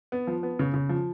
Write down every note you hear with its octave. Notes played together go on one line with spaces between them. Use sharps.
B3
F3
B3
C#3
C#3
F3